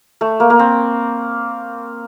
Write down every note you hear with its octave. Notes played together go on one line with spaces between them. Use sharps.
A3
A#3
A#3
C4